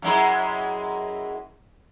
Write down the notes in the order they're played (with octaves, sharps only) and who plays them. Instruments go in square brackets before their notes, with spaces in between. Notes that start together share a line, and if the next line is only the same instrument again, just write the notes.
[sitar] F#2 G#3 E4